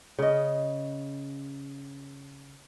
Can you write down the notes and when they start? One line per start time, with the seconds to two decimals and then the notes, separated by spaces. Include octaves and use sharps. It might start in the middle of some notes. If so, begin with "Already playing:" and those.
0.19 C#3 D#5